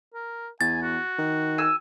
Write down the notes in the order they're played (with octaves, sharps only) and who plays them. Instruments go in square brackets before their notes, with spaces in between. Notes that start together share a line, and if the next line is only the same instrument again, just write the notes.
[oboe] A#4
[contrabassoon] E2 [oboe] G#5 [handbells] A6
[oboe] F#4
[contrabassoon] D#3
[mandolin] G#5 E6